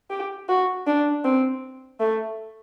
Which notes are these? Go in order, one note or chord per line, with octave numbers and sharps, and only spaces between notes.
G4
F#4
D4
C4
A3